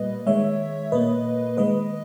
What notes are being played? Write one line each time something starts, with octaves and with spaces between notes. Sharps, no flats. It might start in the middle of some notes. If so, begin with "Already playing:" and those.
Already playing: A#2 G3 A#3 B4 D#5
D#3 G#3 C#5 E5
A#2 A#3 B4 D#5
D#3 G#3 B4 D#5